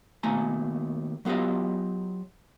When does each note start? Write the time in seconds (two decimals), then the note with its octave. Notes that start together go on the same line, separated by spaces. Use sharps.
0.23 D#2 B2 A3 G#5 A#5
1.25 F#3 B3 F4 G4 D#5